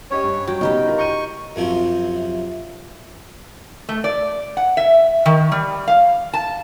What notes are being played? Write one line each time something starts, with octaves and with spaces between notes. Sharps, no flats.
C#4 G4 C#5 D#5
G2
F#3 G5
C#3 B3 D#4 G4 D#5
E4 F4 A#4
A#5 C#6 G6 D#7
F#2 C3 F3
A3
D5
F#5
E5
D#3
G3
F5
A5